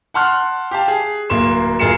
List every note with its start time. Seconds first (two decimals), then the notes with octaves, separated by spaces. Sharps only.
0.14 F#5 A5 C6 F6 F#6
0.71 G4 F5 A5
0.88 G#4
1.30 D1 A#3 C6 E7
1.79 D1 F4 G#4 A#4 C#7 E7